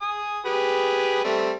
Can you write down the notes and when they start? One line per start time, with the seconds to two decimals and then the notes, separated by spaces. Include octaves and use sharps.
0.01 G#5 D#6
0.45 G4 G#4 B4
1.24 G3 A3 C4